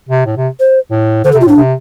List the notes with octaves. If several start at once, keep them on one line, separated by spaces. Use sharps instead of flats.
C3
A2
C3
C5
A2
D3 C5
A4
C3
F4
A2 D4
C3